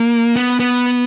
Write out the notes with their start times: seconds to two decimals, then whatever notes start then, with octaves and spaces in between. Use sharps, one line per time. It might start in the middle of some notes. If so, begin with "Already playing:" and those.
Already playing: A#3
0.36 B3
0.60 B3